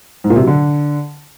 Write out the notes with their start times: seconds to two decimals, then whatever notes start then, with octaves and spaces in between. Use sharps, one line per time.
0.24 G#2
0.30 A#2
0.36 C3
0.42 F#3
0.47 D3